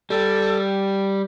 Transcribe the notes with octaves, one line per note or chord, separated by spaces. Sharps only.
G3 A4